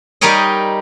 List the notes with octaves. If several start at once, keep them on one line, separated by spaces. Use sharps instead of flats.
G3 D#4 G4 A#4 C#5 D#5